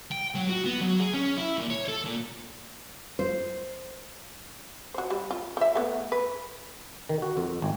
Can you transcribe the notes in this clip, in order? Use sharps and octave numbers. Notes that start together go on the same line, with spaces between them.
G5
F#3
F#4
B3
F#3
G#4
C#4
E4
A#2
C#5
A4
A#2
C5
F#4 C5
G3
F4
F3 E5
A3 B3
B4
D#3
F#4
F2
G#1